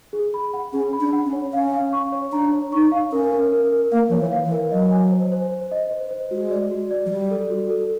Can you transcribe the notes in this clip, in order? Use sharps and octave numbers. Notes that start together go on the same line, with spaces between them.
G#4
B5
F#5
C#4 G#4
B5
D4
F#5
C#4
C#5
C#4 F5
F5
C#6
C#5
D4 A#5
C#5
D#4 C#6
F5
C#4 A#4
A#4
A#4
A#4
A#3 F5
F3 C#5
E3
F5
E3
A#4
F#3 D#5
G#5
C5
C5
C5
D#5
C5
C5
G#3 F#4
D5
F#4
D5
F#3
G3 D5
A4
F#4
A4